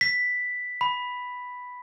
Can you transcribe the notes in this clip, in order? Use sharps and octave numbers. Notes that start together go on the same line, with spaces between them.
B6
B5